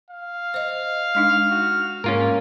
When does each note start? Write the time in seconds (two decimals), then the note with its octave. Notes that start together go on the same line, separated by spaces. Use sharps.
0.10 F5
0.54 C5 D#5
1.15 G#3 D4 D#4 F6
1.51 F#4
2.04 G#2 A#3 C#4 F4 A#4